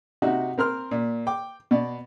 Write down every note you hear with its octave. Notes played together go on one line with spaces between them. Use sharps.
C3 D#4 F#4 E5 F#5
C4 A#4 C6 F6
A#2
G5 D6
B2 D5